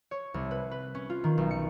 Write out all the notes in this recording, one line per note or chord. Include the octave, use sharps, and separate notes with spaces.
C#5
C2
B4
B4
C#4
F4
D#3
B1
C#7